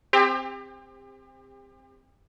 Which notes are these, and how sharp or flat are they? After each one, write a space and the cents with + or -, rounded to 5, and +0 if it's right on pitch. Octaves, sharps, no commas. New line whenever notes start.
C4 +0 G4 +35